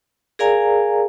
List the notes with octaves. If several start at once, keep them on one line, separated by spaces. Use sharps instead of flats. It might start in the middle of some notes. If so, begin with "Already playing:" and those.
G#4 A#4 D5 F5 G#5 A#5